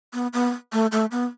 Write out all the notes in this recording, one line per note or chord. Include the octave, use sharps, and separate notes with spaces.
B3
B3
A3
A3
B3